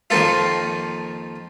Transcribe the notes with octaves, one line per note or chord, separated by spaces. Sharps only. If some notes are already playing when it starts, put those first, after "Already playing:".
F2 D#3 A#3 F4 A4